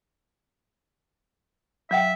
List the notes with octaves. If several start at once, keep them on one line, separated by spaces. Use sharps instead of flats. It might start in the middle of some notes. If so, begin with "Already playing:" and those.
F#3 E5 F#5 G5